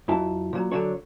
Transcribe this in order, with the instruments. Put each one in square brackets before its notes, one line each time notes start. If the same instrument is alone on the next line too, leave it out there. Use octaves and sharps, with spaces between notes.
[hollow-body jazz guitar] F2 F#3 E4 A5
A#2 F#3
D3 F#3 D4 C#5